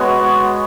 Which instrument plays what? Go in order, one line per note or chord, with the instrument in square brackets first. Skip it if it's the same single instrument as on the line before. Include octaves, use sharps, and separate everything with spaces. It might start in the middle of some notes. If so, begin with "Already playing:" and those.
Already playing: [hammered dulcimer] G#3 B3 F#4 B4 C#5